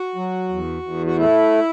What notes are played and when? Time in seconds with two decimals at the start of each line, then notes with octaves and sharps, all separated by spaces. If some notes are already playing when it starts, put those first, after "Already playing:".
Already playing: F#4
0.15 F#3
0.49 E2
0.82 E2
1.06 F#4
1.17 A3 E4